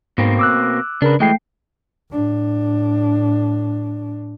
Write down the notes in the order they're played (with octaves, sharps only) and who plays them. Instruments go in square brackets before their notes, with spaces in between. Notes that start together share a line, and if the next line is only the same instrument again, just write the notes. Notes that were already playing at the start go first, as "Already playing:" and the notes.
[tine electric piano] G#2 [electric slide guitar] B2 A#3 C4
[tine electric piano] D6 E6 F#6
[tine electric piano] C#3 A#4 [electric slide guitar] D4 B4
[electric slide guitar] E3 G#3 [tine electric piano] A3 G5 C7
[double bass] A2 D4